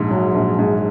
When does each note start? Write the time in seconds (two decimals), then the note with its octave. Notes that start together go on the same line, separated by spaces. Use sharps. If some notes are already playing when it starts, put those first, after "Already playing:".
Already playing: A#1 G#2
0.11 F#3
0.34 A#1
0.59 G#2